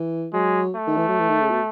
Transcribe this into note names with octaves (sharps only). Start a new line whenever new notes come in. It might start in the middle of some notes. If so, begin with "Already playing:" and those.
Already playing: E3
F#3 G#3
A3
D#3
E3
F#3
E3
D#3
C#3
B2